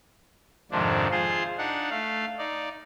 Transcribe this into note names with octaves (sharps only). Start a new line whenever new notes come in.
F2 G#2 C3 D#3 F3 D4
F4 G#4 C5 C6
D4 D#4 F#5
A3 F5
D#4 D5